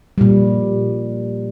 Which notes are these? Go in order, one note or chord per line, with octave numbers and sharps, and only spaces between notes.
A#2 G3